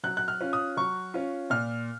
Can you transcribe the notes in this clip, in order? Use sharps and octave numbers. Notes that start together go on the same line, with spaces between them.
F#3 F#6
F#6
F6
C#4 F4
D#6
F#3 C#6
C#4 F4
A#2 F6